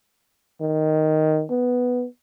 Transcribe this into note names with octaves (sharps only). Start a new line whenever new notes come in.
D#3
B3